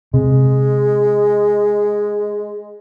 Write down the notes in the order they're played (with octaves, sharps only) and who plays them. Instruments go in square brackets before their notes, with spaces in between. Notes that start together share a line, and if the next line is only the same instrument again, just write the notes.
[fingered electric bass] C3 [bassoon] G#3